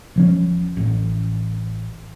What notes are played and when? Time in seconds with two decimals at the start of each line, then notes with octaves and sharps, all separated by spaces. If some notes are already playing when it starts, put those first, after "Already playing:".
0.16 E1 F3 C#4
0.77 A1